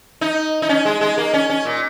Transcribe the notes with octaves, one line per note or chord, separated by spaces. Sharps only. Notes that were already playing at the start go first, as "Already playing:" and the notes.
D#4
D#4
C#4
G#3
G#3
A#3
C#4
C#4
A#2